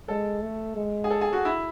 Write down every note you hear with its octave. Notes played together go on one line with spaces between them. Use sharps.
G#3 A4
A3
G#3
G#4
A4
G#4
F#4
E4